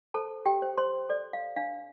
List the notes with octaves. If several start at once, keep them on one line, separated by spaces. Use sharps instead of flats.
A4 C5 A5
G4 G5
C5
C5 C6
A4 D5
F5
D4 F5